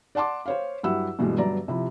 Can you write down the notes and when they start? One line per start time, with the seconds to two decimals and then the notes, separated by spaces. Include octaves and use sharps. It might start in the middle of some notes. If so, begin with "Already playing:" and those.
0.15 D5 F#5 A5 C6 D6
0.46 C5 C#5 F5
0.83 G2 F#3 E4 G4 F#5 E6
1.19 G2 B2 E3 G3 G#3
1.38 G1 G2 F#3 D5 A#5
1.68 C3 F3 E4